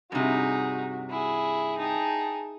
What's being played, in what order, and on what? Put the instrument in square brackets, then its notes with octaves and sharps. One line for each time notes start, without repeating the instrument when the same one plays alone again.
[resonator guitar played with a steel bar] G2 C3 [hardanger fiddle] D#4 G#4 [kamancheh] F#4
[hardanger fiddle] E4 G#4
[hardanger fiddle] D#4 G#4 [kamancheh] G5 A5